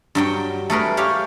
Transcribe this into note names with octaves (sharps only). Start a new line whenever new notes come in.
G2 F#3 G5
A3 G#4 A#4 B4
G4 C#5 F5